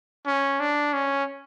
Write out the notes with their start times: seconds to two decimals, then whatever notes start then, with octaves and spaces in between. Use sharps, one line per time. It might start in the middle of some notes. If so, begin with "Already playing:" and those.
0.26 C#4
0.60 D4
0.94 C#4